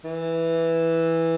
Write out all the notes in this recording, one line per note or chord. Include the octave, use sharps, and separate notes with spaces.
E3